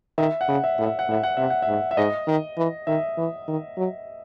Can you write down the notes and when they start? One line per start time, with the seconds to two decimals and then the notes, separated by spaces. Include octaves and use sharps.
0.18 D#3 E5
0.41 F#5
0.48 C#3
0.64 E5
0.78 A2
0.86 E5
0.99 F#5
1.08 A2 E5
1.23 F#5
1.37 C3 E5
1.50 F#5
1.62 E5
1.68 G#2
1.91 E5
1.97 G#2 D#5
2.28 D#3
2.57 E3
2.87 D#3 E5
3.17 E3
3.48 D#3
3.77 F#3